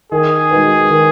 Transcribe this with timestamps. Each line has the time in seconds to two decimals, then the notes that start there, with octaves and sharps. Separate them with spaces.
0.12 D#3 G#4
0.51 G#3 D#4 F#4 B4
0.90 D#3